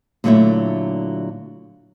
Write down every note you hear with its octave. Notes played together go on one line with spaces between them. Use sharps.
A#2 D3 F#3 G3 A3 E4